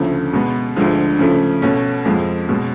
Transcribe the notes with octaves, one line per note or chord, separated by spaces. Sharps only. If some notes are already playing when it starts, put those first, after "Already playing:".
Already playing: D2 C#3 F3 A3
B2 G#3 B3
D2 D3 F3 G#3
C#3 F3 A3
B2 A3 C#4
F2 F3 G#3
B2 G#3 C#4